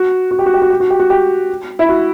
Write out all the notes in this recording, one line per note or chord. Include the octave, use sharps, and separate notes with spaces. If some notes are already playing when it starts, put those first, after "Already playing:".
Already playing: F#4
F#4
G4
F#4
G4
F#4
G4
F#4
G4
F#4
G4
E4
F#4